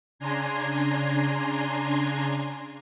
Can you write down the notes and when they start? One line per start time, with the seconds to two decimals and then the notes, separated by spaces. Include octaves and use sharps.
0.19 C#3 D4 G#5 A#5 C6 G#6